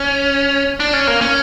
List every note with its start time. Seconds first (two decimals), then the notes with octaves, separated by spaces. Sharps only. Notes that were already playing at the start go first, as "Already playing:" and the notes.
Already playing: C#4
0.80 D4
0.93 C#4
1.07 A#3
1.21 C#4